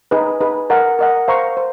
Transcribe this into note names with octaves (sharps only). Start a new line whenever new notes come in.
D#4 G#4 B4
D#4 G#4 B4
A#4 D#5 F#5
A#4 D#5 F#5
C5 F5 A#5 C#6
C5